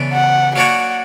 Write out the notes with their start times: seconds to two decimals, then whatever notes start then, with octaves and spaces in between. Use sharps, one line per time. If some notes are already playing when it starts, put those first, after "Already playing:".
Already playing: C#3 E3 B3 D4
0.13 F#5
0.56 F#3 A#3 D4 F#4 C#5 F#5